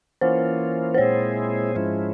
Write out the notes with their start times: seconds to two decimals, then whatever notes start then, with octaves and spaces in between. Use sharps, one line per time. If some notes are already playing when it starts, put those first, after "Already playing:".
0.21 E3 A#3 C#4 F4 C5
0.94 C5
0.98 A#2 G#3 C4 E4 G#4 C#5
1.75 G#2 F3 G#3 C#4 E4